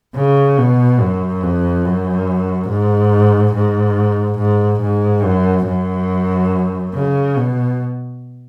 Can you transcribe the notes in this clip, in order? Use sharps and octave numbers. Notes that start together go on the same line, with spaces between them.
C#3
B2
F#2
F2
F#2
G#2
G#2
G#2
G#2
F#2
F#2
C#3
B2